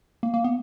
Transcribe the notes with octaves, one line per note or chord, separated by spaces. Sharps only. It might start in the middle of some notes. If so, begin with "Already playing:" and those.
A#3
A#3
B3